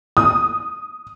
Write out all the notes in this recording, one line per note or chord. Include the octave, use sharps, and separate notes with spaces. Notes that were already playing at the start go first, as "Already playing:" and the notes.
D#6